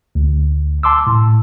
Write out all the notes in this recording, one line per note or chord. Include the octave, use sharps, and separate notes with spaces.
D2
A5 C6 D6 E6
A2